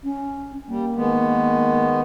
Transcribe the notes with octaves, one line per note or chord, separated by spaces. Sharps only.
C#4
G3 A#3
D#3 G#3 B3